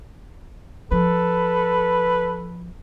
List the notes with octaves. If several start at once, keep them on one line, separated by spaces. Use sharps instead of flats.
F3 A4 B4